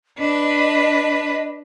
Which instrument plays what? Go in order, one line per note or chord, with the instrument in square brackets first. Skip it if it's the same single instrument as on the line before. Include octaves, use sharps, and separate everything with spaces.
[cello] D4 B4 [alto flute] D#5